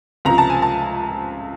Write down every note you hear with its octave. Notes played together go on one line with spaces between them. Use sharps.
C#2 C3 F3 A#5
A5
G#5
A5